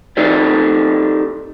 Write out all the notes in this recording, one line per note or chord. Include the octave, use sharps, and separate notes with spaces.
D#4 G4 A4 D5